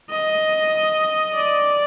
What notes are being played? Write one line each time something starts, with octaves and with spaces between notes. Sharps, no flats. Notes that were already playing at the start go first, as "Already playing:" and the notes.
D#5
D5